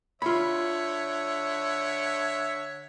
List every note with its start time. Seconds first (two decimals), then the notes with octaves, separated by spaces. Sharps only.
0.22 D3 F4 C#5 E5 B5